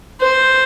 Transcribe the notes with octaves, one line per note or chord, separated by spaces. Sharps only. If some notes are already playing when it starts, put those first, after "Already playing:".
C5